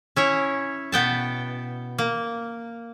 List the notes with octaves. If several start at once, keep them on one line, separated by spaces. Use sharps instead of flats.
C#4 E4 C#5
B2 B3 G5 A5
A#3